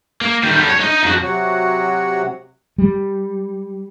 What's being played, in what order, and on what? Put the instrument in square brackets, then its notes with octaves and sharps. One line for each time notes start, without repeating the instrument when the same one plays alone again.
[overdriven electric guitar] A#3
D#3 G3
D3 G3
C#5
D#4 D#5
F2 F#4
[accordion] C3 F#3 F#4 C#5 F#5
[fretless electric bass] G3